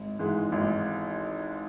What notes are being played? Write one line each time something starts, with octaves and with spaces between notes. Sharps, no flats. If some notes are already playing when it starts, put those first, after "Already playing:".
Already playing: G#1
G#2 E3 G#3
G#1